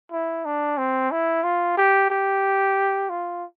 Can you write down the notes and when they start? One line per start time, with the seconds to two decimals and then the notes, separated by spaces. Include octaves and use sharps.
0.12 E4
0.45 D4
0.78 C4
1.11 E4
1.44 F4
1.77 G4
2.10 G4
3.10 F4